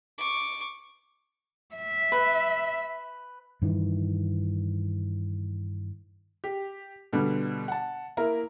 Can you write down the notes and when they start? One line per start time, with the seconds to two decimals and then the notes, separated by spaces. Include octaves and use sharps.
0.18 C#6 D6
1.75 E5
2.12 B4
3.62 G2 D#3 E3
6.44 G4
7.13 B2 D3 G3
7.68 F#5 A5
8.17 A#3 E4 A#4 A#5